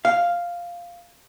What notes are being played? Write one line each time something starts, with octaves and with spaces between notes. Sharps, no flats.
F5